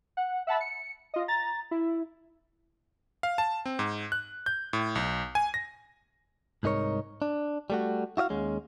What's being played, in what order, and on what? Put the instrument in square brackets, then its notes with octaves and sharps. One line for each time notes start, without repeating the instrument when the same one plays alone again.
[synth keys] F#5
E5 F#5 A5 B5
C#7
F4 D#5
A#5 A6
E4
[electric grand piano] F5
A5
C4
G#2
F#6
G6
A2
B1
G#5
A#6
[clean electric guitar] C2 G#2 D#4 A#4 C#5
D4
G3 A3 F#4
E4 F#4 D#5 F5
D#2 G#3 C#4